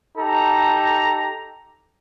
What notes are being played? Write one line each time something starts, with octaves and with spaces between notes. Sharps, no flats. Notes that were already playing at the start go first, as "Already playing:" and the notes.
D#4 G4 A4 A#5